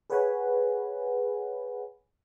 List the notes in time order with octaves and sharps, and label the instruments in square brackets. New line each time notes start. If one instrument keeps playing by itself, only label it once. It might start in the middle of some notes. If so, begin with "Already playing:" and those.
[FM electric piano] G#4 B4 C#5 F#5 G#5 B5